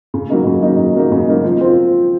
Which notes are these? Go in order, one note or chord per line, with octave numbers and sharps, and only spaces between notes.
C#3
F#3 A#3 D#4
C#3
F#3 A#3 D#4
C#3
F#3 A#3 D#4
C#3
F#3 A#3 D#4
F3
C4 F4